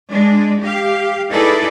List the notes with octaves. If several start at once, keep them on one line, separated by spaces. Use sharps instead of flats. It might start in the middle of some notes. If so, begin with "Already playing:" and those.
G#3 D4
G4 F5
D#4 E4 G#4 A4 B4 D5